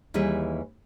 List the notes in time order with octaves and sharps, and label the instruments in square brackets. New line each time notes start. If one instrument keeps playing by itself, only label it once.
[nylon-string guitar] D#2 E3 G3 G#4 B4